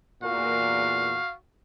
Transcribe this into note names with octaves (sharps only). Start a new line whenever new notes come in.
E2 A#2 F#4 F5